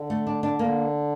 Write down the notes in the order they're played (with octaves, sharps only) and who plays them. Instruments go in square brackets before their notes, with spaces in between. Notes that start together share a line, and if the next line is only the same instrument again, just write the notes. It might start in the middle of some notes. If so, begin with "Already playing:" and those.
Already playing: [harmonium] D3
[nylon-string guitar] A3
D4
D4
[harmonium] D3 [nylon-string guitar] A#3